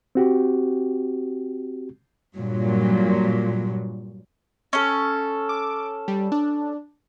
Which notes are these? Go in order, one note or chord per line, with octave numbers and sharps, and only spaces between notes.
C4 F#4 G4
G2 A#2 F#3
C#4 A4
D6
G3
D4